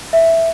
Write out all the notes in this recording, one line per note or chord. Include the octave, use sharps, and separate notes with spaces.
E5